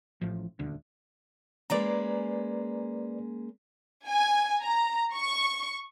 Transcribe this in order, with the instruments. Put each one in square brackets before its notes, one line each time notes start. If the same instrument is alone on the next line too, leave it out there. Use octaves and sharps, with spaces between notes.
[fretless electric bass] A1 A2 F3
D#1 D2 D3
[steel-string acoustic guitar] G#3 A#3 C#4 [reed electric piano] B4 D5 A#5
[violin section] G#5
A#5
C#6